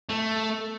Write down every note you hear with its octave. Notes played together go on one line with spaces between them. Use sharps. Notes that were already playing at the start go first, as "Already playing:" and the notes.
A3